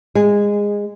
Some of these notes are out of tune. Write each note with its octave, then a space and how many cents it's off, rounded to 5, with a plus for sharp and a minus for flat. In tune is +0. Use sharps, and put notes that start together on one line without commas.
G#3 -20